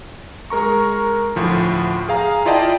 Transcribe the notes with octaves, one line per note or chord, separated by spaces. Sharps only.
G#3 A#4 A#5 C#6
D2 A2 F3
G#4 F5 A#5
E4 F4 D5 D#5 G5 A5